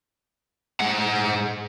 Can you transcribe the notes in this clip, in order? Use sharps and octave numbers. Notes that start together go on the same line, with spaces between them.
G#2 F#5